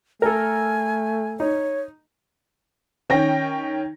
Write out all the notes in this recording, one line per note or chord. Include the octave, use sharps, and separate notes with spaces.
A3 A4 A#4 G#5
D#4 C#5
D#3 C#4 G5 A#6